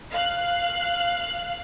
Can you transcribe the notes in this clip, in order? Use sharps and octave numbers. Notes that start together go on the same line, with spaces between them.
F5 F#6